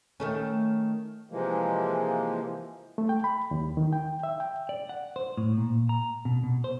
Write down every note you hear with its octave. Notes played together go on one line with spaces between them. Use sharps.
D#3 A3 C#4
C3 E3 F3 G#3 A#3
A3
G5
B5
D#2
D#3
G5
E5
G5
D5
F#5
C5
A2
A#2
A#5
B2
B2
C5